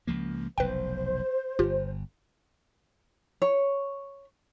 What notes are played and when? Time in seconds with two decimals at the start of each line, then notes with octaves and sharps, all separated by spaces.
0.07 C#2 F3 A#3
0.58 F1 B1 B4 C5 G5
1.59 G1 F4 G4
3.42 C#5